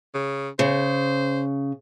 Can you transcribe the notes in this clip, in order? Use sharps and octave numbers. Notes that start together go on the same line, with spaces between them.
C#3
C#3 C5